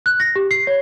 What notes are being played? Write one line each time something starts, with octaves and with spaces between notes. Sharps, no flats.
F#6
A#6
G4
C7
C#5